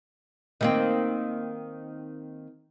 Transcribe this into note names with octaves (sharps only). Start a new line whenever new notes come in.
D#3 A#3 C4